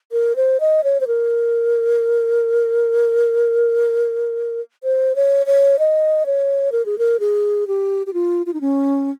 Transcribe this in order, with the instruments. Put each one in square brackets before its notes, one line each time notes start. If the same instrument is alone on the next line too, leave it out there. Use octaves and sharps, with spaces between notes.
[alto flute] A#4
C5
D#5
C#5
C5
A#4
C5
C#5
C#5
D#5
C#5
A#4
G#4
A#4
G#4
G4
G4
F4
F4
D#4
C#4